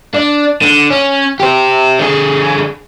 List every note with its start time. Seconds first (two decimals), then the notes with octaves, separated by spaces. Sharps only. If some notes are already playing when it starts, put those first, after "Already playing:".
0.14 D4
0.62 D3
0.91 C#4
1.40 G4 C5
1.99 D3 G#4